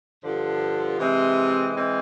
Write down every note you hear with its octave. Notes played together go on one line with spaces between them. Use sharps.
G2 D3 F3
C3 E3 G#3 C4
E3 G#3 C4